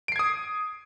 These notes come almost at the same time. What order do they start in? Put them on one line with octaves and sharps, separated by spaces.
D7 C7 G#6 D#6